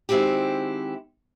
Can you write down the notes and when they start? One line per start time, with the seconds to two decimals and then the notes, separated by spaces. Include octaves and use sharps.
0.09 D#3 G#3 C4 E4 F#4 G4